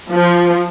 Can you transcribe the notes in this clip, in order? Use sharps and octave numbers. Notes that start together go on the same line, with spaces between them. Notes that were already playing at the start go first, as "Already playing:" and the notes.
F3